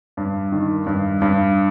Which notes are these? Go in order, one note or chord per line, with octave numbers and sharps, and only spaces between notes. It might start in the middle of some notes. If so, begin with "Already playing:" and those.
G2
D#3
G2
G2